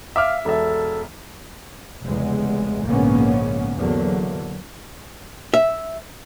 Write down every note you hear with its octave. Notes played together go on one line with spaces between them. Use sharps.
E5 F5 D6 F6
E1 A4 E5
F1 E2 C#3 G#3
A#1 G#2 C#3 A#3 B3 C#4
E2 D3 F#3 A#3
E5